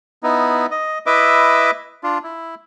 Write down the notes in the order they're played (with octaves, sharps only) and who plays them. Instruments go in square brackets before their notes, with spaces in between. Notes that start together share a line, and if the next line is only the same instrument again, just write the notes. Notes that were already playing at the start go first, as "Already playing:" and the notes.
[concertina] B3 D#4 E4
D#5
E4 B4 D#5 E5 D6
D4 F4
E4